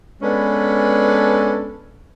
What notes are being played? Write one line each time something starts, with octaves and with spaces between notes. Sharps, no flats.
G#3 B3 C#4 D4 A4 B4